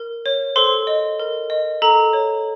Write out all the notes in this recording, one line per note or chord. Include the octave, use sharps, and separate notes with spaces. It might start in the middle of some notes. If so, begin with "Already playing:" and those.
Already playing: A#4
C#5
A4 C5 C6
D#5
A#4
D#5
A4 A#5
C#5